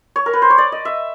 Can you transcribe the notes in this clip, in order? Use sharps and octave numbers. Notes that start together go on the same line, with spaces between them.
C#5
A#4
B4
C5
C#5
D5
D#5
E5